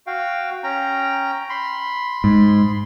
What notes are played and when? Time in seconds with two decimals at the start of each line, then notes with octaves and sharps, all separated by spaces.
0.07 F#4 F5 G5
0.63 C#4 G5 A#5
1.49 B5 C6
2.24 G#2